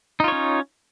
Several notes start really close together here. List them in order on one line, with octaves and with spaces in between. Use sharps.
D#4 F4 C#5 C#4